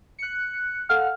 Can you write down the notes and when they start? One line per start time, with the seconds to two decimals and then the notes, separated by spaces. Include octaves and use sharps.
0.19 F#6 C#7
0.89 A4 F5 F#5 F6